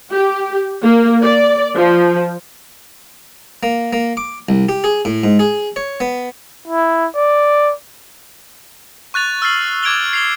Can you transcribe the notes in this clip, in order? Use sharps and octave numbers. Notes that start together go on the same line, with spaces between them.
G4
A#3
D5
F3
A#3
A#3
D6
C2
G4
G#4
A2
G#2
G#4
C#5
B3
E4
D5
C#6 F#6 A6 F7
E6 F6 A6 C7 F#7
D6 G#6 D7 F7 G7
C7 F7 G7